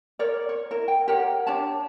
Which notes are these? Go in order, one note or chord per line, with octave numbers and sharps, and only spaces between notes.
A#4 C#5 D5
C#5
E4 A#4
G5
G4 A#4 C#5 F#5
D4 G4 C#5 A5